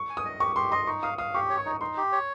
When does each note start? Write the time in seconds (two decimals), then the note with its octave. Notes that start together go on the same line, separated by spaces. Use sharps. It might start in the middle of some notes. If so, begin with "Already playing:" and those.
Already playing: C#6
0.10 G#5
0.17 D#6
0.25 D#5
0.40 G4 C#6
0.56 G4 C6
0.72 D#5 C6
0.87 D#4 C#6
1.03 F5 D#6
1.18 F5 D#6
1.34 G4 C#6
1.50 C#5
1.58 C#6
1.66 D#4
1.81 D#4 C6
1.97 G4
2.12 C#5